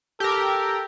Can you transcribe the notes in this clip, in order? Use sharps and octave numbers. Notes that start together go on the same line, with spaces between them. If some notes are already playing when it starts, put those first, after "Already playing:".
G4 A4 A#4